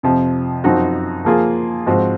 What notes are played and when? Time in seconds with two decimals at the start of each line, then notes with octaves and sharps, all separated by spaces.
0.03 F2 C3 F3
0.64 F#2 F3 C4 D#4 F#4
1.25 F3 A#3 F4 G#4
1.86 G#2 F3 C4 F#4